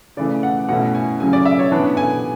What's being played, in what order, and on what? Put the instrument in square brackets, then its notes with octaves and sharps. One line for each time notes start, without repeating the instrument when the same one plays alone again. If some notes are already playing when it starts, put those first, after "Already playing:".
[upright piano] C#3 E3 A3 D5
F#5
B2 A3 C#4 E4 F#5
G#5
C#3 F#3 C#4 G#5
D5
E5
C#5
E3 B3 D4
G#5